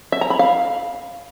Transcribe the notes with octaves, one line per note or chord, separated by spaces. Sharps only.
E5
A#5
B5
F5